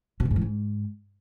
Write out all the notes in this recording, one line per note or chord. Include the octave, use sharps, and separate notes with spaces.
B2
D#3
G#2
E3
G#2